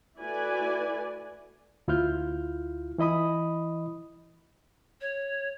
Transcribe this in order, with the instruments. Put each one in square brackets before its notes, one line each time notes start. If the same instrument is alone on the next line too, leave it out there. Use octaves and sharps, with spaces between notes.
[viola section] A3 E4 F#4 B4 D5 G#5
[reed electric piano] D2 E4 F4 F6 G6
E3 E4 D#5 B5 D#6
[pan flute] C#5